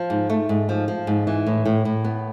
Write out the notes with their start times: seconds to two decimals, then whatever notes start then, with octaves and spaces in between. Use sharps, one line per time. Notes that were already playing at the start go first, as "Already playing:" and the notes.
Already playing: F3
0.10 G#2
0.30 A3
0.49 G#2
0.69 F3
0.88 F3
1.07 G#2
1.27 E3
1.47 A2
1.66 A2
1.85 A2
2.04 B3